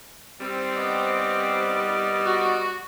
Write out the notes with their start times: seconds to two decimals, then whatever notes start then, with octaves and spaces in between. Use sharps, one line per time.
0.40 G3 C4
0.76 B3 D5 D#5
2.25 F#4